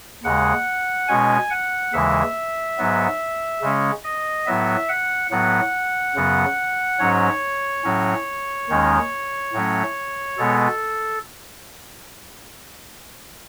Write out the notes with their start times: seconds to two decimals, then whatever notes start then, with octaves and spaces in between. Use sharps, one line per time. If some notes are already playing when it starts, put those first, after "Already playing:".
0.23 D#2 C#3 G#3 F#5
1.08 B2 G#3 C#4 G#5
1.50 F#5
1.93 D#2 C#3 E3 G#3 E5
2.78 G#2 F#3 B3
3.62 C#3 G#3 C#4
4.04 D#5
4.46 A2 F#3 B3 E5
4.89 F#5
5.31 A2 F#3 B3 F#5
6.15 F#2 C#3 F#3 B3
7.00 G#2 F#3 C#4 C#5
7.84 A2 F#3 C#4
8.70 D#2 D#3 G#3 C#4
9.53 A2 F#3 A3 C#4
10.38 B2 G#3 B3 A4